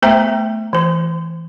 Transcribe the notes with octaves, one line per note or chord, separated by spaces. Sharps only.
A3 B3 C5 E5 G5 A#5
E3 C5